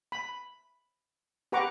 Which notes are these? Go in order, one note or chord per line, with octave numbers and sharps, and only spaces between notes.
B5
G4 B4 F#5 A#5 C#6 D6